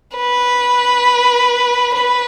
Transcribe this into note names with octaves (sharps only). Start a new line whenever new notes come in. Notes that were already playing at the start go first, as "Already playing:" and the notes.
B4
B4